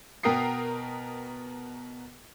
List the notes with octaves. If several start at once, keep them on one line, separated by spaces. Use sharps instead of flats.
B2 B3 A#4 G5 D#6 C7